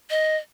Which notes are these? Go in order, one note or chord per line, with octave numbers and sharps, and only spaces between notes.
D#5